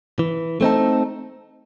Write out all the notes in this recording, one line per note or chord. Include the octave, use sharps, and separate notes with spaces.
E3
A3 C4 D#4 A4